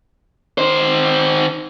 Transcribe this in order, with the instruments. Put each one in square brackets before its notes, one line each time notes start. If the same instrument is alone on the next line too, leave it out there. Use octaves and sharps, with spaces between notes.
[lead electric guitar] D#3 C5